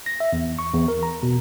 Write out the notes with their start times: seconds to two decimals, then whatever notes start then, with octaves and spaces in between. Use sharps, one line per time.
0.06 A#6
0.20 E5
0.33 E2
0.59 C#6
0.73 E2
0.88 A#4
1.03 A#5
1.23 B2